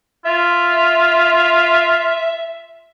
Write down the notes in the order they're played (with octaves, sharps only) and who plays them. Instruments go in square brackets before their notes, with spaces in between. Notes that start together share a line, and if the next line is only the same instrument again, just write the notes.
[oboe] F4 [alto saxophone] E5